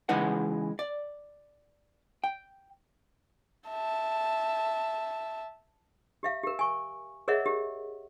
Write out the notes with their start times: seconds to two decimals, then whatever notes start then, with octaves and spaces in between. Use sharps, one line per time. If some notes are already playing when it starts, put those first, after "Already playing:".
0.09 C#3 E3 G#3 D#4 B4 F#5
0.79 D5
2.24 G5
3.69 E5 A5
6.23 G4 E5 F5
6.43 G4 A#4
6.59 G#5 C#6
7.28 G#4 A#4 C#5 D#5 E5 F#5
7.46 G4